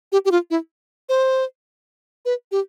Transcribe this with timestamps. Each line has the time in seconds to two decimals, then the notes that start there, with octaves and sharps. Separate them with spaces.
0.12 G4
0.25 G4
0.32 F4
0.50 E4
1.09 C5
2.25 B4
2.52 G4